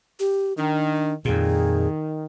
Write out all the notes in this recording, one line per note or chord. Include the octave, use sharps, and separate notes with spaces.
G4
D#3 D4
F2 A#2 D#3 G#4